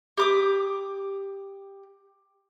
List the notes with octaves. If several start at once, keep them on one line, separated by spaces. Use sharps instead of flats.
G4 D6 D#6